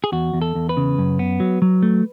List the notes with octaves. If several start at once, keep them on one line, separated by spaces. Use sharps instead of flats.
G#4
E2 F#4
E2
A4
E2
B4
C#3
F#2
B3
F#3
F#3
A3